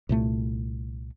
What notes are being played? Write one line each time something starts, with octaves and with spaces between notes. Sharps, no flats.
C2 A#2 A3